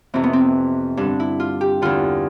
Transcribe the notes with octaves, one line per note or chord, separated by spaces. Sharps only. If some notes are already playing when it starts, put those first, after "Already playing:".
F2 C3 E3 C4
B3
C4
G2 D3 D4
E4
F4
G4
E2 D3 F4